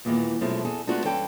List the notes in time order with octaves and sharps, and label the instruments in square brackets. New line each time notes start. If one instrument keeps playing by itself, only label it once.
[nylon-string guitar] D#2 A#2 E3 G#3 B3
F#2 B2 F3 G#3 A3
E2 G#4 A4
G#3 A3 B3 D4 F4 F#4
G2 E3 C#4 A4 G5